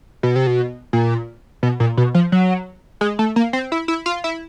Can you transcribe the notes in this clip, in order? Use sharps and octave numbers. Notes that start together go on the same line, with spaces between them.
B2
C3
B2
A#2
B2
A#2
B2
F3
F#3
G#3
A3
A#3
C4
E4
E4
F4
E4